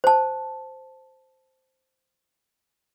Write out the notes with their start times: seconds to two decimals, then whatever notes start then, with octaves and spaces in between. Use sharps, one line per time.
0.04 C5 A5